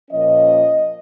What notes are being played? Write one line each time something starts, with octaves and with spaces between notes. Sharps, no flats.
A#2 F3 A#3 C#4 D#5